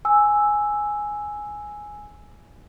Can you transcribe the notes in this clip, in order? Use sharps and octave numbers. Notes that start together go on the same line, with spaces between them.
G#5 E6